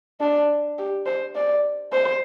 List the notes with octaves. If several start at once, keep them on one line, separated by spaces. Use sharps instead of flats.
D4
G4
C5
D5
C5